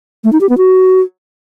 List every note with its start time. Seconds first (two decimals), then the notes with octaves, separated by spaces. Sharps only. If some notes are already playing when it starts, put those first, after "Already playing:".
0.24 A3
0.32 D#4
0.41 G4
0.49 B3
0.58 F#4